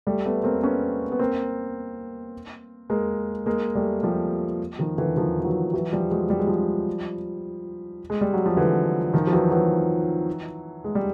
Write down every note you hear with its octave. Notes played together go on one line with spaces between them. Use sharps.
G3 A3
A3 B3
A#3 C4
B3 C#4
B3
A#3 C4
G#3 A#3
G#3 A#3
G3 A3
F3 G3
D#3 F3
D3 E3
D#3 F3
F3
E3 F#3
E3 F#3
F3 G3
F#3 G#3
G3
G#3
F3 G3
G#3
G3
F#3
F3
D3 E3
D#3 F3
F3
E3 F#3
E3 F#3
G#3
G3